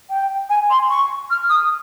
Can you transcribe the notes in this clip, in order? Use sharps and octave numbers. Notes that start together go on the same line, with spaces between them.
G5
G#5
C6
C#6
F6
D#6